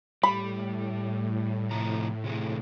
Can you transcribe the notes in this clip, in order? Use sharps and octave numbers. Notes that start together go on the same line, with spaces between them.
A2 G3 B5
C3 F3 A#5
C3 E3 G#4